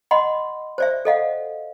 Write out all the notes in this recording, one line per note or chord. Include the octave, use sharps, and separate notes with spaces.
D#5 F#5 B5 C6
C5 D5 E5
A4 D#5 F5 F#5